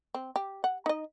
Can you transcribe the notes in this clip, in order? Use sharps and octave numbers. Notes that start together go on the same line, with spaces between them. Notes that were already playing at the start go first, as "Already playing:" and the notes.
C4
G4
F#5
D#4 D#5